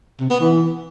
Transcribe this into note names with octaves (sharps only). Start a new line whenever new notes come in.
C3
B3
E3